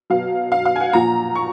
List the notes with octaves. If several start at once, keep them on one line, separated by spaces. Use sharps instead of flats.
B2 F#3 F5
F5
F5
G#5
F#5
A#2 F3 A#5
C#6